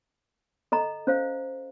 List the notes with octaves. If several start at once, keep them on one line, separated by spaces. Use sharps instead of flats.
A4 D#5 A#5
C#4 C5 F5